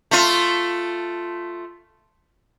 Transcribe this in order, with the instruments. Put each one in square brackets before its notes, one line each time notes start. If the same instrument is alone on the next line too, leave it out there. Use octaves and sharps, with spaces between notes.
[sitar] A3 F4